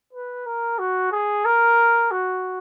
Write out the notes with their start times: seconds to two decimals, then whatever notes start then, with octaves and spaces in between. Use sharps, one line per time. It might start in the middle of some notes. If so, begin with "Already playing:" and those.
0.13 B4
0.46 A#4
0.79 F#4
1.12 G#4
1.45 A#4
2.11 F#4